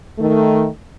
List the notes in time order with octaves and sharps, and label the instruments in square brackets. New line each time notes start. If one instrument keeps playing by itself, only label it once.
[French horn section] D#3 A3